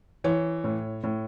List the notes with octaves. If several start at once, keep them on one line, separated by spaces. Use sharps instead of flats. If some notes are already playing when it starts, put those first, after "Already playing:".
E3 C#5
A2
A2